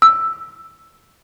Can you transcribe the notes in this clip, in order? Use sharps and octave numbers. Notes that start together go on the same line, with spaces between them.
E6